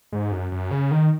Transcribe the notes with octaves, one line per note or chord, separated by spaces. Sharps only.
G#2
F#2
F#2
C#3
D#3